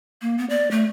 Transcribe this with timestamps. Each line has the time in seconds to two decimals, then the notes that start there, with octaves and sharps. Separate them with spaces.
0.22 A#3
0.38 B3
0.50 D5
0.71 A3